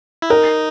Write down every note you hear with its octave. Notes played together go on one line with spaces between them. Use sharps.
E4
D#4 A#4